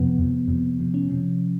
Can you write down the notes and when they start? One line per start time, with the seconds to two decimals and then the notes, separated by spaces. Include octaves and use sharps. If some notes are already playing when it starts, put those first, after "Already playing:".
Already playing: F2 C3 F3 B3
0.18 F2 C3 F3
0.48 F2 C3 F3
0.79 F2 C3 F3
0.94 C#4
1.10 C3 F3